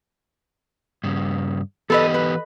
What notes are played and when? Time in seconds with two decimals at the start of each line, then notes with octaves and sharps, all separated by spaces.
1.04 G2 C#3
1.90 E3 B3 G4 A4 B4 D#5
2.14 B4